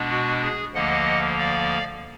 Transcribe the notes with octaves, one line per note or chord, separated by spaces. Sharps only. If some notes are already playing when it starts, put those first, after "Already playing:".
Already playing: B2 G#3 B3 D4
F#4
G#4
D2 D3 F3 A#3 D#5 F#5
D5 F5